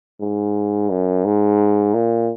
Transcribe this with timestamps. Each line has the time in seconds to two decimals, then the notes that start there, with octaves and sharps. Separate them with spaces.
0.20 G#2
0.90 F#2
1.25 G#2
1.94 A#2